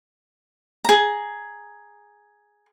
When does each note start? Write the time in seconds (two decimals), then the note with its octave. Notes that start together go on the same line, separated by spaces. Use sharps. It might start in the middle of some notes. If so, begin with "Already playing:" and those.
0.84 G#4 A#5